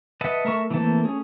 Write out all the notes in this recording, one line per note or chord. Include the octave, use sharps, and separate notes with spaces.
B4 D#5 E5 F#5 A5
A3 A#4 E5 A5 C#6
E3 A3 A#3 C4 A5
A3 C#4 G#4